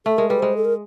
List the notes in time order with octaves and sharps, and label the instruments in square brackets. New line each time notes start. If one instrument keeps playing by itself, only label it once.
[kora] A3 [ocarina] A4
[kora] G#3 [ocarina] A#4
[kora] G3 [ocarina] B4
[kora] G#3 [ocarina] C5
[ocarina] A4
A#4